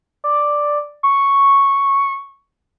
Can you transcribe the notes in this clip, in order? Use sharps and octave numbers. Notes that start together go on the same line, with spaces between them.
D5
C#6